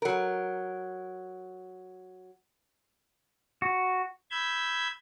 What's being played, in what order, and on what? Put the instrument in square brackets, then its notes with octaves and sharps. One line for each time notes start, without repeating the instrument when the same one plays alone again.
[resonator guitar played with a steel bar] F#3 A#4
[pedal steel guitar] F#4
[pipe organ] B5 E6 G6 G#6